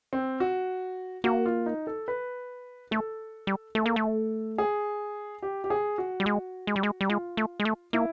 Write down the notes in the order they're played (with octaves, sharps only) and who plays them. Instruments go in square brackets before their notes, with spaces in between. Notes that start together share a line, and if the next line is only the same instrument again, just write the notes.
[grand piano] C4
F#4
[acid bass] A#3 [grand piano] F#4
[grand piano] F4
D#4
A4
B4
[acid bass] A3 [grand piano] A4
[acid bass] G3
[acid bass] A3 [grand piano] A4
[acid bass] A#3
A3
[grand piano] G#4
G4
G4
G#4
F#4
[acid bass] G3
G#3
G#3
G3
G#3
G3
[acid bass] G#3 [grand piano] F4
[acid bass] A3
G#3
A3
[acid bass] A#3 [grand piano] E4